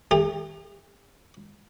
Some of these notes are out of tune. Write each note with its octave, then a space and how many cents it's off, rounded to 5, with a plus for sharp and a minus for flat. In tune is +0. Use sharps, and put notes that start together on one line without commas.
A3 +5 G4 +45